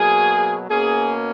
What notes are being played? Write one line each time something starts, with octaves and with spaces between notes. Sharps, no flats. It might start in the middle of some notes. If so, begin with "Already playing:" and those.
Already playing: B2 F#3 A#3 G#4
B2 A#3 C#4 G#4